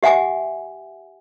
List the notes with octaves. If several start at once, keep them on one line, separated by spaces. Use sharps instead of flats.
G4 E5 F#5 G#5 D6